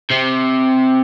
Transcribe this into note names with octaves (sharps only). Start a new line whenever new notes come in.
C3